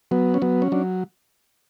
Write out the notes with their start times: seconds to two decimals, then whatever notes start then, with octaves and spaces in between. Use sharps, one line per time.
0.11 F#3 B3
0.34 C#4
0.42 F#3 B3
0.62 C#4
0.72 F#3 D4